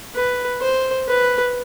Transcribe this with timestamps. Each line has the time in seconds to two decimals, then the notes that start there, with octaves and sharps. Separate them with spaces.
0.14 B4
0.61 C5
1.08 B4